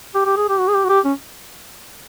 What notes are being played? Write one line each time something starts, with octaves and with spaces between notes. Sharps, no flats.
G4
G4
G#4
G4
F#4
G#4
G4
F#4
G4
C#4